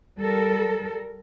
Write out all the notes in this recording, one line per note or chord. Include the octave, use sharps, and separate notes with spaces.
G3 A4 A#4